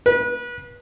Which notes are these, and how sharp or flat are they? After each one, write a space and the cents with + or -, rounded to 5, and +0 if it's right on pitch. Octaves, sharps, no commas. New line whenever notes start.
B4 -30